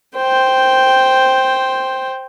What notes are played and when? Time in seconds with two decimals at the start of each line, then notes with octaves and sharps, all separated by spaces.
0.17 C5 G5